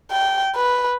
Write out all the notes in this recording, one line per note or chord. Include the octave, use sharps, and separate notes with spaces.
G5
B4